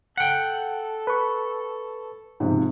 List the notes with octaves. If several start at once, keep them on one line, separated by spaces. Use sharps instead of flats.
A4 F#5 G5
B4 C#6
G#2 C3 F3